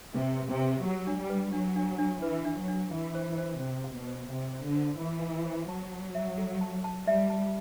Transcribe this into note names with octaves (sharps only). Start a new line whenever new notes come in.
C3 B4
B4
C3
B4
F#3 G4
D4
G3
B4
F#3 D4
D4
D4
E3 B4
D4
F#3
D4
E3 F#5
C5
C5
C3 C5
F#5
B2
C5
C3 F#5
C5
D3
C5
E3 B5
F#5
C5
F#3 A5
A5
E5
A4
A5
A5
G3 E5
A5